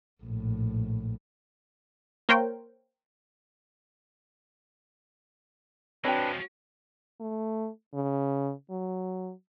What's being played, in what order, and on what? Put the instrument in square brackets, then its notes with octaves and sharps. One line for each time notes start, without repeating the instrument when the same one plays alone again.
[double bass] A#1 A2
[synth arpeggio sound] A#3 A#4 C5 C#5 G5
[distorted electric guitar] F3 G#3 [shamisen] C4 G5 [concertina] D4 B4 [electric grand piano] F#4 C#5
[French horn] A3
C#3
F#3